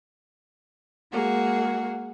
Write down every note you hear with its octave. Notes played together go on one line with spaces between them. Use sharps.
G#3 A#3 F#4 G#4